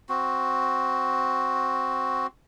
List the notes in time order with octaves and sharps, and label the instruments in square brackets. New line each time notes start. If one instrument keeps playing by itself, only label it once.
[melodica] C4 F#4